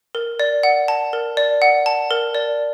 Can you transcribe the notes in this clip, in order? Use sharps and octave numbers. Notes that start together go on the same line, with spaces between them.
A#4
D5
F#5
A5
A#4
D5
F#5
A5
A#4
D5